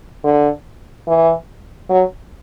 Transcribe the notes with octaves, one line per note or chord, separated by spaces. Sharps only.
D3
E3
F#3